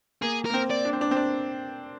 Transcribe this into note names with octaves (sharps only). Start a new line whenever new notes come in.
A#3 G#4
A#3 A#4
C4
D5
D4
C4
D4
C4
D4